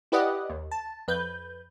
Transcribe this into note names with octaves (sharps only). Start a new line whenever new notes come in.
E4 G4 B4 D5 D#5 F#5
D#2
A5
F2 B4 G6